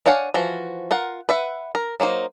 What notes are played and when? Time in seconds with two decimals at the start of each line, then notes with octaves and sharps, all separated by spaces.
0.06 D4 C#5 F5 F#5 G#5
0.34 E3 F3 F#4
0.91 F4 A#4 F#5
1.29 B4 E5 F#5
1.75 A#4
2.00 F#3 A#3 D#4 C5